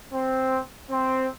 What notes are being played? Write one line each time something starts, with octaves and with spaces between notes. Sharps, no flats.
C4
C4